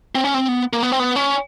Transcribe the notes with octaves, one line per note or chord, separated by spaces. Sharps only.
C4
C#4
C4
B3
A#3
B3
C4
B3
C#4